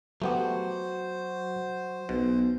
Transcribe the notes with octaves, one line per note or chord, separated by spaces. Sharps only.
F#3 A3 B3 F#4 G4 C5
B1 B2